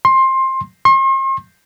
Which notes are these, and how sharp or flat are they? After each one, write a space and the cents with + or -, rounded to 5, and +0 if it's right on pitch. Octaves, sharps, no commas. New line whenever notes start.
C6 +20
C6 +45